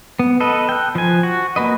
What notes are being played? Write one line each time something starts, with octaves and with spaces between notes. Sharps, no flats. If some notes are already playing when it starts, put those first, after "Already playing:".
B3
A4 B4 D#5
G5 F#6
F3 G#5
F#4
A#3 F#4 B4 D#5